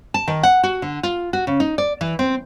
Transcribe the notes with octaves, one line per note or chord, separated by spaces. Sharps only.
A5
D#3
F#5
F#4
D3
F4
F#4
C#3
D#4
D5
E3
C4